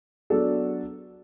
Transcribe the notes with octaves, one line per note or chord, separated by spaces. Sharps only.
F#3 B3 D4 F#4 A4